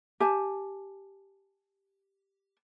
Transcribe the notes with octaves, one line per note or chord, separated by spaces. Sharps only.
G4 G#5 A5